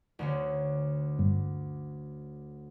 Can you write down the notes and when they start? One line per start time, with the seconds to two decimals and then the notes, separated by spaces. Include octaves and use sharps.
0.19 D2 D3 C#4
1.19 G2